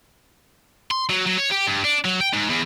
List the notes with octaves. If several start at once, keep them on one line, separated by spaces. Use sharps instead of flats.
C6
F#3
F#3
C#5
G4
G2
D4
F#3
G5
G#2
E2